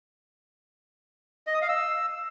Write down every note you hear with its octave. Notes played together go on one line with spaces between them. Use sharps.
D#5
D#6
F5
E6